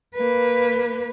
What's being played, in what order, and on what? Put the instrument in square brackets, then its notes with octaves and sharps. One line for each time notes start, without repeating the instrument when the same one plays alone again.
[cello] A#3 B4